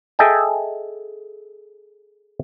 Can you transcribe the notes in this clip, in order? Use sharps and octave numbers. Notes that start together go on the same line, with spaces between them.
G#4 A4 D#5 E5 G5 G#5